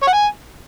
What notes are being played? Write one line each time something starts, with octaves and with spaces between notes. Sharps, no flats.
C#5
F#5
G#5